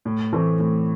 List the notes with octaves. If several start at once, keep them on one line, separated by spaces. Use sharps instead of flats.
A2
E3 A3 C4
A2